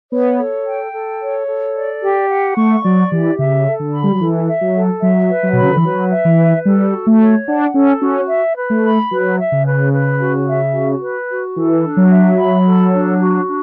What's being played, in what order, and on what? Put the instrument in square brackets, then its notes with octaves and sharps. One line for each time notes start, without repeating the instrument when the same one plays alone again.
[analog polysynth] B3 [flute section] C#5
[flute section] A4
G5
A4
C#5
A4
D5
G4
F#5
[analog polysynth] A3 [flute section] C#6
[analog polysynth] F#3 [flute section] D5
[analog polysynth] E3 [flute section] G4
[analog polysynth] C#3 [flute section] E5
[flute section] A4
[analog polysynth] D3
[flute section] B5
[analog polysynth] G3
F#3
[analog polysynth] E3 [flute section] A4
[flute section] E5
[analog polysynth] F#3
[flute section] A4
[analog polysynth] F#3 [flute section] E5
[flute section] B4
[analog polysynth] F#3
B2
[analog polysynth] C#3 [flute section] B5
[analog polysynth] D3
E3
[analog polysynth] F#3 [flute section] B4
[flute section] E5
[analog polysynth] E3
[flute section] B4
[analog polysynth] G3 [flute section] A4
[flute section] F#4
[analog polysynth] A3
[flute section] C#5
[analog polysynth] D4 [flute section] F#5
[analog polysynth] C#4 [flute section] A4
[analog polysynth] C#4 [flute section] F#4
[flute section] E5
B4
[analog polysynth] A3
[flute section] B5
[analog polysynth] F#3 [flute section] B4
[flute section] E5
[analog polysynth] C#3
[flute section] B4
B4
F#4
E5
F#4
B4
F#4
[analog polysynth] E3 [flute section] A4
[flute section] D4
[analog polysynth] F#3
[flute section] E5
B5
A4
D4
F#4
D4